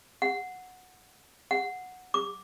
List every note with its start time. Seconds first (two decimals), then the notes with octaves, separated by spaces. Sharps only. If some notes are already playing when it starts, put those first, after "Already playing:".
0.22 F#5
1.51 F#5
2.14 D6